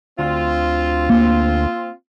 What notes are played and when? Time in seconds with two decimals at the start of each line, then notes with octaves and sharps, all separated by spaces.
0.19 D2 C4 F4
1.10 A#3